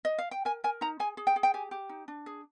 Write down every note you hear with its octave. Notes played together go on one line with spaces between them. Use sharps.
D#5
F5
G5
A#4 G#5
A#4 G#5
D#4 A#5
G#4 G#5
G#4
G5
G#4
G5
G4 G#5
G4
D#4
D4
G#4